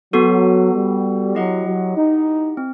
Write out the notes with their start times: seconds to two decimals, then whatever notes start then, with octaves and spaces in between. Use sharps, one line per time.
0.13 F#3 B3 F#4 A4
0.74 G3
1.35 F#3 E4 G4 D#5 F#5
1.66 F#3
1.96 D#4
2.57 C4